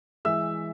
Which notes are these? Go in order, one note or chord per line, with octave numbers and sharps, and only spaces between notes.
E3 G#3 E5 E6